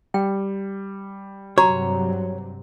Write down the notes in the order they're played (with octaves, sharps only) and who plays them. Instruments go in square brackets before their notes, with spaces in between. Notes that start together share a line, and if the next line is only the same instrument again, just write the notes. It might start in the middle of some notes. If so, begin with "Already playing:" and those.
[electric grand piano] G3 [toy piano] G5
[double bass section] G2 C3 F#3 [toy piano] F#4 A#5 D6 [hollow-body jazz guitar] C#5